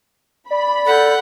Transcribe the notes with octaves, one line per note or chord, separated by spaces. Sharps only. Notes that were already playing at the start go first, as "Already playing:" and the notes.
D5 B5
A4 F#5 G6